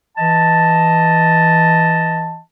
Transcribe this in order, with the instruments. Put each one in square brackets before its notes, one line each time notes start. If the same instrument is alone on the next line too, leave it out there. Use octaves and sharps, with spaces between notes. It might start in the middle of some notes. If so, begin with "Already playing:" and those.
[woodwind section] E3 D#5 A5